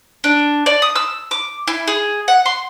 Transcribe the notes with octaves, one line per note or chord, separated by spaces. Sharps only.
D4
D5
D#6
E6
D6
E4
G#4
F#5
C6